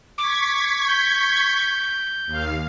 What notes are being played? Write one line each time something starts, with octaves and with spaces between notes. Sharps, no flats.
C#6 D6 G#6 B6
G6
D#2 F5